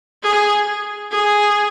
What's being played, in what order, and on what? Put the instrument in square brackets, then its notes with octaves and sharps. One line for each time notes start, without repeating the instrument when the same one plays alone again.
[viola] G#4
G#4